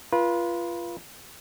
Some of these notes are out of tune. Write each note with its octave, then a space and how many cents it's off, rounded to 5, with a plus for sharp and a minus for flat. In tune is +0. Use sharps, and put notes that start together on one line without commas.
F4 -20 B4 -35